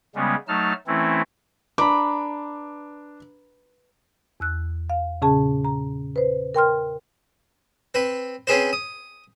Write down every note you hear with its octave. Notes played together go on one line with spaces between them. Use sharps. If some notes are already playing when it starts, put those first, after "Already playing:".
C#3 G3 G#3 B3 C#4
F#3 A3 D#4 A5 F6
E3 A3 C4 C#4 E4
D4 B4 A#5 B5 D6
E2 E6 F#6
F5
A#2 C#3 C#4 G#4 A5
A#5
B4 C5
A#4 G5 C6 F6
C4 B4
C4 C#4 G#4 B4 C5
D#6